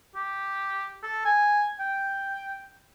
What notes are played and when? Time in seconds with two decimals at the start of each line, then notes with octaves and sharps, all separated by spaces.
0.15 G4
1.03 A4
1.25 G#5
1.80 G5